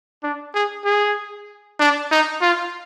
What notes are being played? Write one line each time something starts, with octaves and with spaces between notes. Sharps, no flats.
D4
G#4
G#4
D4
D#4
F4